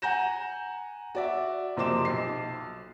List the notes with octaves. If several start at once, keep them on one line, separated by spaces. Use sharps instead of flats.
F#5 G#5 A#5 G6 A#6 E7
F#4 D5 E5
F#1 C3 F3 C6 D6 E7
B1 C7